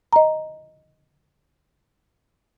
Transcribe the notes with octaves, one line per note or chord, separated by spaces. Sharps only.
D#5 A#5